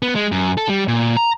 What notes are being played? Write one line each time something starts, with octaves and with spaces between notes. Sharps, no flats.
B3
G#3
F#2
A4
G3
A#2
A#5